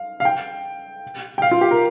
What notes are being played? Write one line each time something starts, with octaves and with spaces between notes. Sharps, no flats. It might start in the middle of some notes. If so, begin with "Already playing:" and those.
Already playing: F5
F5
G5
G5
F5
F4
G4
A#4